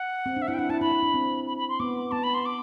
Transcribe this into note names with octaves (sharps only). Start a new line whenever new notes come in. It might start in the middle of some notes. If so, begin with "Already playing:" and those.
Already playing: F#5
C4
D4
E5
E4 F#5
G5
D4 F#5
E4 A5
E4 B5
E4
D4
C4
B5
B5
C6
B3 D6
B3 A5
B5
C6
D6